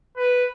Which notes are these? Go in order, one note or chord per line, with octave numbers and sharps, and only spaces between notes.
B4